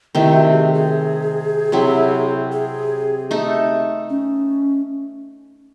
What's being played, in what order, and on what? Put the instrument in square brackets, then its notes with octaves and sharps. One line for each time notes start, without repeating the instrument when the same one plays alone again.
[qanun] C3 D#3 A3 [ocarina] E4
[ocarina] F#4
G#4
G#4
[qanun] C3 F#3 C4 E4
[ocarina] G#4
[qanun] A3 D#4 A4
[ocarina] C#4